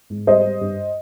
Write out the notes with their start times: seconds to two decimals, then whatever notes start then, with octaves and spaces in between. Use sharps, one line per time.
0.10 G#2
0.27 G3 C5 D#5
0.45 G3
0.61 G2